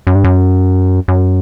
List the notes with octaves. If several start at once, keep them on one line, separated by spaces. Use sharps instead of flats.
F#2
G2
F#2
F#2